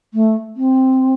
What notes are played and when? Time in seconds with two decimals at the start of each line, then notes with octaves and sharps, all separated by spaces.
0.14 A3
0.56 C4